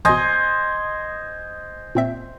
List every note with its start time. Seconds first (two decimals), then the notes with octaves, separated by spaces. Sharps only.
0.05 A1 B2 C5 D#5 G#5
1.95 A#2 C4 E5